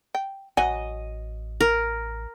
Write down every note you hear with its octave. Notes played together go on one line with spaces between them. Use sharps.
G5
A1 F#3 D#5 F#5 G#5
A#4